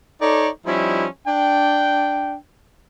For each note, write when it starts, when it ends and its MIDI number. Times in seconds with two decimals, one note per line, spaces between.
0.21 0.49 63
0.21 0.49 69
0.21 0.49 73
0.21 0.49 74
0.66 1.06 53
0.66 1.06 55
0.66 1.06 61
0.66 1.06 63
0.66 1.06 64
1.28 2.36 62
1.28 2.36 79